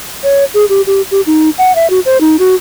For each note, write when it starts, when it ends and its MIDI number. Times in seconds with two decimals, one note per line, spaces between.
0.23 0.45 73
0.54 0.65 68
0.69 0.81 67
0.87 1.02 67
1.11 1.21 67
1.27 1.50 63
1.58 1.74 78
1.75 1.90 76
1.90 2.00 66
2.06 2.18 72
2.21 2.36 63
2.39 2.55 66